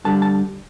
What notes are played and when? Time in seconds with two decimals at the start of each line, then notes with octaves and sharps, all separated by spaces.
0.04 G2 D3 G3 A5
0.22 A5